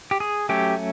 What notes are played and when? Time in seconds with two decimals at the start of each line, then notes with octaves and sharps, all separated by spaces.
0.11 G4
0.20 G#4
0.49 F#3 A3 C#4 G4